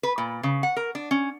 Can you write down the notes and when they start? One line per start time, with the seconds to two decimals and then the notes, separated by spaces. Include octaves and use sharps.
0.03 B4
0.18 A#2
0.43 C#3
0.63 F#5
0.77 A#4
0.95 D4
1.11 C#4